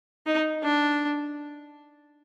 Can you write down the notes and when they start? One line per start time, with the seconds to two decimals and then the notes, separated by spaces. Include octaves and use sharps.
0.26 D#4
0.63 D4